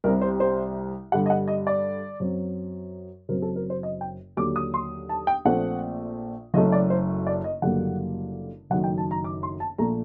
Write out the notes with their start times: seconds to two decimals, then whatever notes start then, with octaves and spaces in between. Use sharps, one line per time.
0.04 C2 C3 G3 C4 A#4
0.21 C5
0.40 C5
1.12 G2 D3 G3 F#5
1.26 D#5
1.30 F#5
1.48 D#5
1.67 D5
2.20 F#2 F#3 C4
3.29 F#1 F#2 F#3 C4 A#4
3.42 A4
3.56 A#4
3.70 C5
3.83 D#5
4.01 G5
4.37 D#2 D3 F#3 D6
4.56 D#6
4.74 C6
5.09 A5
5.27 G5
5.45 A#1 A#2 A3 C4 F#5
6.54 F#1 F#2 F#3 A3 D#5
6.72 D5
6.90 C5
7.27 D5
7.44 D#5
7.62 F#1 F#2 D3 G3 A#3 F#5
8.70 F#1 F#2 D#3 A3 F#5
8.84 G5
8.98 A5
9.11 A#5
9.24 D6
9.43 C6
9.60 A5
9.78 A#1 A#2 A3 A#5